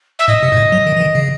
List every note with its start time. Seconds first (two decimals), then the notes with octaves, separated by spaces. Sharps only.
0.19 E5
0.28 A2 D#5
0.43 C3
0.52 G#2
0.57 A2
0.72 F#3
0.87 D#3
0.97 E3
1.01 D#3
1.15 C#3